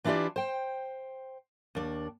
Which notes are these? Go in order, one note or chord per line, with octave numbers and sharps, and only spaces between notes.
E3 D4 E4 F4 G4 D5
C5 G5
D#2 D4